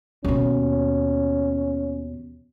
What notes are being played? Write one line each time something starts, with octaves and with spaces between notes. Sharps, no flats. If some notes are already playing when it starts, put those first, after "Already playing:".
D#2 B2 C#4